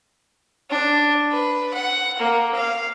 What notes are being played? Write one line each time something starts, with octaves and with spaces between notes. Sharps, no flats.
D4
B4
F#5
A#3
F5